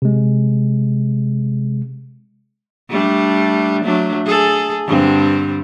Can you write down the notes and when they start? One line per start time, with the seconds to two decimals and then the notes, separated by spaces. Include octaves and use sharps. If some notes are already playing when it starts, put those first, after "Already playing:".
0.02 C3 G#3
2.90 G3 A3 D4
3.84 F#3 A3 D4
4.26 G#4 A4
4.87 G2 D3 C4